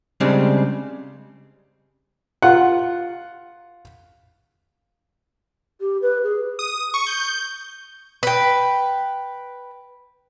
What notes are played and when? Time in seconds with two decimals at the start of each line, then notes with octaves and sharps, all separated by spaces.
0.20 C#3 G3 G#3 C4 D4
2.42 F4 F#5
5.80 G4
6.02 B4
6.24 G#4
6.59 D#6
6.94 C#6
7.06 G6
8.23 B4 G5